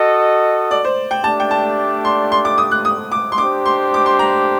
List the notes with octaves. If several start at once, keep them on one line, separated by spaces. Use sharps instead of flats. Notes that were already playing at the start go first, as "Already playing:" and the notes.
Already playing: F#4 A4 D#5
D5
C5
G5
A3 D4 G4 D5 A5
G5
A5
C6
C6
D6
D#6
F#6
D#6
D6
C6
D4 G4 C5 D6
C6
D6
C6
A#5